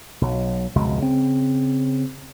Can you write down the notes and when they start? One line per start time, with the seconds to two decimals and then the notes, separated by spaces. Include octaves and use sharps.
0.21 B1 F#3
0.75 F1 C#2 B2 G#3
0.99 C#3 C4